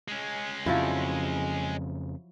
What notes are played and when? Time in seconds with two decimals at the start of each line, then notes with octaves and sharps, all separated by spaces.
0.08 G#3 C#4
0.66 F2 C#3 F3 F#3 E4